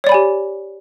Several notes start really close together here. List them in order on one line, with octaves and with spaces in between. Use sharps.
C#5 D5 B5 G#5 G4